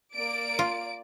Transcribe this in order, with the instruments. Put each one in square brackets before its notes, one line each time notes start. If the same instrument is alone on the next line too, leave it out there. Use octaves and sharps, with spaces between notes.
[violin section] A#3 D5 D7
[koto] F4